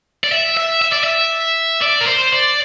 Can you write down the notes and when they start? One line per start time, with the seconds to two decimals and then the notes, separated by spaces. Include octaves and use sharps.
0.24 D5
0.32 E5
0.57 E5
0.82 E5
0.92 D5
1.04 E5
1.82 D5
2.01 A#4
2.07 C5
2.33 D5